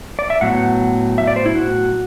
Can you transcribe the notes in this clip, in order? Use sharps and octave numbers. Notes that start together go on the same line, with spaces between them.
D5
E5
A2 F#3 B3 F#5
E5
D5
C5
E4
F#4